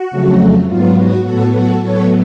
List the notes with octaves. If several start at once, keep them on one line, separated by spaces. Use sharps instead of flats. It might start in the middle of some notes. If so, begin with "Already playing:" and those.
Already playing: F#4
F2 C#3 F#3 A3
G#2 F#3 B3 F4
F#4
A2 F#3 B3 F#4 A4
F#4 A4
A2 F#3 B3 A4 C#5